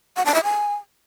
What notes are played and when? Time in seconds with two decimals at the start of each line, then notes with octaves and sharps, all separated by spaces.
0.16 F#5
0.25 A5
0.35 E5
0.44 G#5